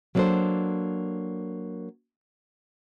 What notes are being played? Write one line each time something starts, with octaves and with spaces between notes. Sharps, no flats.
F#3 A#3 B3 D4 A4 C5